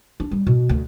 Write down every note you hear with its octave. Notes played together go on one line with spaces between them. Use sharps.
D4
G3
B2
D2